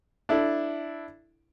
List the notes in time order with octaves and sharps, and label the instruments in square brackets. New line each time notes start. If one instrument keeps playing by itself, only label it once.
[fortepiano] D4 E4 A4